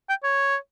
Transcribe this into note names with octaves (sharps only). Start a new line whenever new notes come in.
G5
C#5